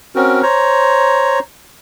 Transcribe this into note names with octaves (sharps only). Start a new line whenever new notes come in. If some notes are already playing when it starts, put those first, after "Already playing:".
C4 C#4 F#4 A#4
C5 C#5 A#5